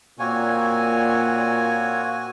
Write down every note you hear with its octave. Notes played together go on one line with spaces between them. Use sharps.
A#2 A#3 C4 F#4 C#5 G#5